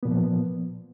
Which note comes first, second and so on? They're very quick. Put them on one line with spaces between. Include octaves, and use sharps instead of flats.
B3 A#2 F3